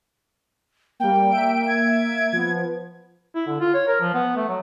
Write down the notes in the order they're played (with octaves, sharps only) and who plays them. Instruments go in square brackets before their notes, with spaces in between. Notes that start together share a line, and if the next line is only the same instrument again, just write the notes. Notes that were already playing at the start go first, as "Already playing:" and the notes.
[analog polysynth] G3 A#3 [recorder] G5
[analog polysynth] A#3 E5 D7
[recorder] G#6
[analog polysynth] F3 B3
[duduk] E4
D3
F4
C#5
A#4
F3
B3
A3
F#3